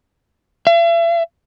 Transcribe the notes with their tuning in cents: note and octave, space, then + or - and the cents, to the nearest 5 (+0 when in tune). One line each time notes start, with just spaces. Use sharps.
E5 +45